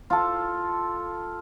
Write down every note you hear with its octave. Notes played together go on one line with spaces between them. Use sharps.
F4 A4